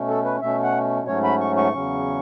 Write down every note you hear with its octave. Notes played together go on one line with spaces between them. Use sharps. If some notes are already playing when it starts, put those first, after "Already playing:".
Already playing: B2 A3 C#4
A4
B4
B2 A3 C#4 E5
F#5
G#2 F#3 A3 C#4 C#5
B5
C#6
C#6
E2 C#3 F#3 C#4